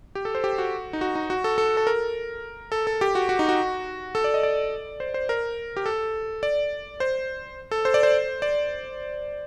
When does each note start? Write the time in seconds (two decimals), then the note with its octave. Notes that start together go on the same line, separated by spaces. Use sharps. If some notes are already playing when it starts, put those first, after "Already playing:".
0.15 G4
0.25 A4
0.35 C5
0.44 G4
0.58 F#4
0.93 D#4
1.01 F#4
1.15 D#4
1.30 F#4
1.44 A4
1.58 A4
1.77 A4
1.87 A#4
2.72 A4
2.87 A4
3.01 G4
3.15 F#4
3.29 F#4
3.39 D#4
3.49 F#4
4.15 A4
4.24 D5
4.34 D#5
4.43 D5
5.00 C5
5.14 C5
5.29 A#4
5.77 G4
5.86 A4
6.43 D5
7.00 C5
7.71 A4
7.85 C5
7.94 D5
8.03 C5
8.42 D5